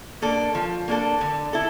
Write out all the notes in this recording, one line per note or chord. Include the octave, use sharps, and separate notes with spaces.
A#3 D4 A4
F3
A#3 D4 A4
D3
E4 A4